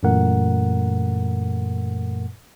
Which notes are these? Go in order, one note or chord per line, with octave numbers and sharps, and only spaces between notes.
F#2 A#2 E3 A3 A#4 F#5